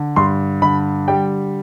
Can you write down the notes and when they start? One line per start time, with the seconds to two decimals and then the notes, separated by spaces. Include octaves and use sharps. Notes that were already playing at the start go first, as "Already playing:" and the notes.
Already playing: D3
0.16 G2 C6
0.62 D3 B5
1.08 G3 G5